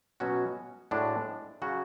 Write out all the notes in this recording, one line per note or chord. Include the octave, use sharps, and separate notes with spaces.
B2 F#3 C#4 F#4
A2 G#3 D4 F#4
C#3 F#3 C#4 F#4